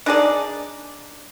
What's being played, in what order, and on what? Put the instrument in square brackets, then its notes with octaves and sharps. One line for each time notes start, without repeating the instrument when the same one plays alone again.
[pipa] D4 D#4 G#4 D5